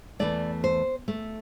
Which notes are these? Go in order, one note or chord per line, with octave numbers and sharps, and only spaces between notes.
E2 C3 E3 A3 D5
C5
A3